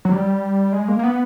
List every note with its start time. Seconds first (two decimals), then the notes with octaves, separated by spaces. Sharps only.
0.05 F#3
0.12 G3
0.73 G#3
0.88 A#3
0.99 A#3
1.03 B3